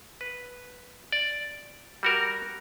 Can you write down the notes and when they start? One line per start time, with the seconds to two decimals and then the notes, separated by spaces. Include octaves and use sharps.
0.21 B4
1.12 D5
2.03 G3 F#4 A#4